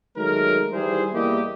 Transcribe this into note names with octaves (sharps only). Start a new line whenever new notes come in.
D#3 F#3 G#3 A3 A#4
D#3 E3 G3 E4 G#4 C5
E2 G3 A#3 E4 G4 D#5